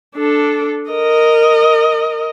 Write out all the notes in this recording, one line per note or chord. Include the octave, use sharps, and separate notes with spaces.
D4 A4
A#4 D#5